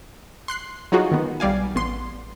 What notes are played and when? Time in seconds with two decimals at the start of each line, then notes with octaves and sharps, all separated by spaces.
0.48 C6 F#6 C7
0.92 F#3 D#4 F4 F#4 G#4
1.12 D#3 B3
1.40 B1 G3 D5 F5 G#5
1.75 A1 B3 C6